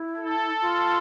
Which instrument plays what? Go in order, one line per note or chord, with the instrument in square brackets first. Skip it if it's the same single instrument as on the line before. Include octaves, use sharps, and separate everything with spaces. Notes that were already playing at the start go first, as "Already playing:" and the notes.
Already playing: [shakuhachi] E4
[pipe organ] A4
[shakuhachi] F4